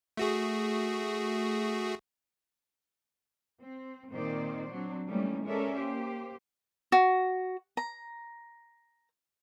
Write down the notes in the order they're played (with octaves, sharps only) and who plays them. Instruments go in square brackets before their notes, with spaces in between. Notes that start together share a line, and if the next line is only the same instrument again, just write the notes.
[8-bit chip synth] A3 F#4 G#4
[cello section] C4
A#2 D#3 C4 D#4 C5 D5
F#3 C4 D4
E3 G3 A3 A#3 C#4 D#4
G#3 C#4 A4 A#4 D5 E5
A#3 G4 C5
[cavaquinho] F#4
A#5